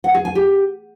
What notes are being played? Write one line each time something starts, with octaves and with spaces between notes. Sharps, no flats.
F#5
G#4
G#5
G4